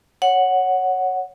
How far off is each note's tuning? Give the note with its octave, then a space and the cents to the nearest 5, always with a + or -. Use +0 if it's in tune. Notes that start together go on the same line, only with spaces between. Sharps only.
C#5 +0 F#5 +0